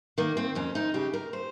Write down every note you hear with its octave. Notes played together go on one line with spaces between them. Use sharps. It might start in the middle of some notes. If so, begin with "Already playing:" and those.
D#3 A#3
C4
F2 C#4
D#4
C#3 G4
A#4
C5